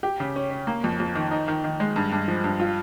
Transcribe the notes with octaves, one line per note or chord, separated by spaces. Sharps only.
G4
C#3
C#4
C#4
A#3
F2
F2
D#3
D#4
D#3
D#3
G#3
G2
G2
F3
G2
F4